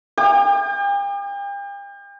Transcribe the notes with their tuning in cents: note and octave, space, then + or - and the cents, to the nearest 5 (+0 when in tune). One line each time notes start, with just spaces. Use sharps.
G5 +40 D6 +45